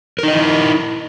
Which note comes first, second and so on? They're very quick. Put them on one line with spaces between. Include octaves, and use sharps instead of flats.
A#4 D#4 D#5 E4